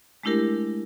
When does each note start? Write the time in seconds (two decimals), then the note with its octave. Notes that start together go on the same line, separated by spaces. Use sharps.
0.23 G#3 A3 D4 E4 G4 A#4